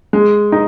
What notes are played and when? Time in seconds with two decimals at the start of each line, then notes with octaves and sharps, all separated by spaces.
0.13 G#3
0.52 D#4